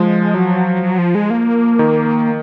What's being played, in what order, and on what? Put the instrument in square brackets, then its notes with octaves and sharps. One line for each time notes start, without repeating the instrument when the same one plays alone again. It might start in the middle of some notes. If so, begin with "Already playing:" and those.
Already playing: [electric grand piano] F3 [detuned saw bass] G#3
[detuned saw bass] F#3
F#3
F3
G#3
A#3
[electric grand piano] D#3